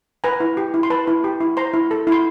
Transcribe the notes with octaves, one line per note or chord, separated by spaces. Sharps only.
B4 G#5 A#5
E4
G4
E4
C6
B4 A5 B5
E4
G4
E4
C5 A#5 C6
E4
A4
E4
C6